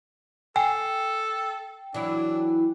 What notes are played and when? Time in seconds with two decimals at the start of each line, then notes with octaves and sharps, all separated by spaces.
0.56 A4 G5 G#5
1.94 E3 F#3 D4 E4